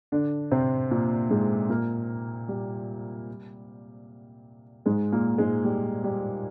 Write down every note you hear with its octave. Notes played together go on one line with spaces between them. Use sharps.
D3 D4
C3 C4
A#2 A#3
G#2 G#3
A#2 A#3
G3
G#2 G#3
A#2 A#3
G#2 G#3
G3
G3